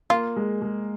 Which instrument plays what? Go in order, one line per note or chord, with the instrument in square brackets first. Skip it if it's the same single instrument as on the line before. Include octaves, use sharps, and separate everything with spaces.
[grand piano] A#3 [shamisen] F4
[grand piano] G#3
G#3